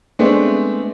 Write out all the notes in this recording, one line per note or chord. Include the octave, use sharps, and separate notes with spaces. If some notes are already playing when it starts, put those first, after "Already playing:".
G#3 A3 B3 C4 D4